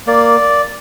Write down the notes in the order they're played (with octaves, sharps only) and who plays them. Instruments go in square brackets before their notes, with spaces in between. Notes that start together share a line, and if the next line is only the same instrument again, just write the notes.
[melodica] A#3 D5